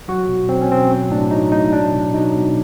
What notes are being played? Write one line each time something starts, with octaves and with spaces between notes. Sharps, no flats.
F#3 F#4
B2
F#3 C4
C#4
B2 C4
F#3
A2 D4
F#3 D#4
A2 D#4
F#3 D4
B2
F#3 D#4
B2